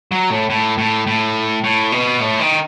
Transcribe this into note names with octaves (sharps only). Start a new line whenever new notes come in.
F#3
A2
A2
A2
A2
A2
B2
A2
D#3